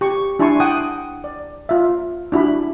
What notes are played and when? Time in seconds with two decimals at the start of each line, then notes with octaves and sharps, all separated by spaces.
0.01 G4 C#6
0.39 D4 E4 G#5 A5 C6 C#6
0.60 F#5 G5 D#6
1.24 D5
1.69 F4 E5
2.32 D4 E4 F#4 B5